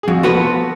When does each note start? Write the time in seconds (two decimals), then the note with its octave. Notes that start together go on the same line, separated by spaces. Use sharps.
0.03 G#4
0.08 F2 F#4
0.23 F3 B3 F#4 A4 B4